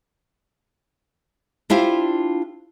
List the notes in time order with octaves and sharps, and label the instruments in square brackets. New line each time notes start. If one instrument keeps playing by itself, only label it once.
[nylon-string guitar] D4 E4 F4 G4 C5